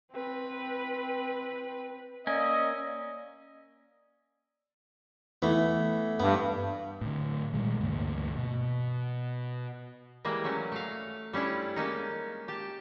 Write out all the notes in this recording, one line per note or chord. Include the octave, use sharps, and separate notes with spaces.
C4 B4
A#3 C#4 D5 D#5 E6
E3 A3 B3
G2 B3
A2 D3
A#2 D#3 G3 G#3
D2 G2 E3 A#3
B2
E3 G3 G#3 A#3
F#3 A3 C#4
A3 F5
G3 C#4 D4 E4 F4
G#3 A#3 C#4 D#4
G4 A5